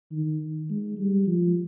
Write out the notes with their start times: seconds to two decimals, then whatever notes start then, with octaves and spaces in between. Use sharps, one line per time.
0.12 D#3
0.70 G#3
0.98 G3
1.27 F3